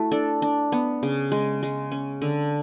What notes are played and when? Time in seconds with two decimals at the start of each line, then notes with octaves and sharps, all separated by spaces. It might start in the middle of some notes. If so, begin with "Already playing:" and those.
Already playing: A3 E4 F#4
0.11 D4 A4
0.42 D4
0.72 B3
1.03 C#3
1.32 G#3
1.63 G#3
1.92 C#4
2.22 D3